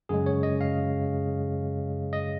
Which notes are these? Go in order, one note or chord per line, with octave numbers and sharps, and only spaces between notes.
F#2 C#3 G#3 G#4
C#5
D#5
F5
D#5